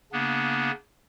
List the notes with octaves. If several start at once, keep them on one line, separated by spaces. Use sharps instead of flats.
C#3 A#3 B3 D4